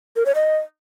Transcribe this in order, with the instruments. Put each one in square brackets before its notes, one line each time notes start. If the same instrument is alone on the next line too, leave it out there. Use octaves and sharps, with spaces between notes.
[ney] A#4
C#5
D#5